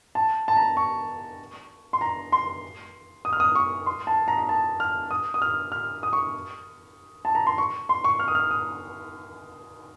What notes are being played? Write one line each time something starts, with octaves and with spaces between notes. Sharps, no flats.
A5
A5
A#5
C#6
C6
A#5
C6
D#6
F6
D#6
C#6
C6
A5
A#5
A#5
A5
F6
D#6
D#6
F6
F6
D#6
C#6
A5
A#5
C6
C#6
C6
C#6
F6
D#6
F6
D#6